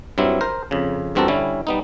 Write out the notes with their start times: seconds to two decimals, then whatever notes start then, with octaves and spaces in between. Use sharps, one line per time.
0.18 G2 F#3 C4 E4
0.41 A#4 C5
0.71 F2 C#3
1.15 E2 G2 C4 F#4 A4 A#5
1.28 D3 G3 C#4 E4
1.67 G3 B3 D#4